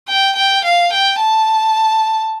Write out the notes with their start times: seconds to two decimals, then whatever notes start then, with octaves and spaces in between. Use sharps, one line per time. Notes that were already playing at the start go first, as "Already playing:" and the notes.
0.08 G5
0.36 G5
0.65 F5
0.93 G5
1.20 A5